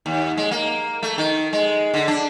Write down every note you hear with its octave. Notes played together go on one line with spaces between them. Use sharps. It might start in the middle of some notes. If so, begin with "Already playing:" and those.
D#2
G#3
A#3
A3
D#3
G#3
D3
D4